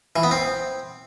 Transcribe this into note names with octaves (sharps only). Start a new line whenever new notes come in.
E3
B3
C4